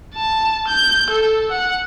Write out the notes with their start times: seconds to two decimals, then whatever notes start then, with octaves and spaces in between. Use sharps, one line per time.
0.16 A5
0.68 G6
1.11 A4
1.52 F#5